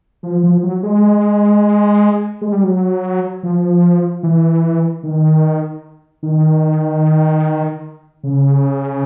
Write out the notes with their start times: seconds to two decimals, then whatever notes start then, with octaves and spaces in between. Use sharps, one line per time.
0.23 F3
0.43 F3
0.63 F#3
0.83 G#3
2.42 G#3
2.52 G3
2.64 F#3
3.43 F3
4.23 E3
5.03 D#3
6.23 D#3
8.24 C#3